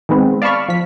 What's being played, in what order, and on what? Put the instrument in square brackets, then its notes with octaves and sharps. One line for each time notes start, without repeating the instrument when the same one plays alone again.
[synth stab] D#3 G#3 B3 C4
D5 F5 A5 B5 C#6 F6
F3 B6